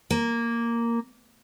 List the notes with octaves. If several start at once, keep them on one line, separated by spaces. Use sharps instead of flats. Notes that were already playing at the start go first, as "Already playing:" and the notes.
A#3